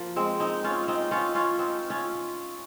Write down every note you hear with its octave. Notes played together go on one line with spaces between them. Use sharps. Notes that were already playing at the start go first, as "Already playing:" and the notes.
Already playing: F3 A#3
G#3 C4
C4 D#4
C#4 F4
C4 D#4
C#4 F4
C#4 F4
C4 D#4
C#4 F4